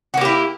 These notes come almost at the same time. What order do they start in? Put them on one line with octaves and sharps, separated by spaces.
F#4 A#3 G4 E4